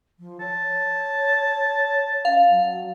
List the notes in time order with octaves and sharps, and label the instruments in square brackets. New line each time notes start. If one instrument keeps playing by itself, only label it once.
[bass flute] F3
[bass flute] C#5 [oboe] A5
[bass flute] C#5
[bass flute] C#4 [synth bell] F5
[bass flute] F#3